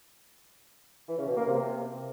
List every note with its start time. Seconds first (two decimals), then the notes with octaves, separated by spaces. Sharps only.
1.08 E3
1.18 C#3
1.27 B2
1.37 A#3
1.47 C3